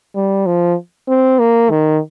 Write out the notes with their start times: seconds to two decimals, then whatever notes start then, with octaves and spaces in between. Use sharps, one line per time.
0.15 G3
0.46 F3
1.09 C4
1.39 A#3
1.70 D#3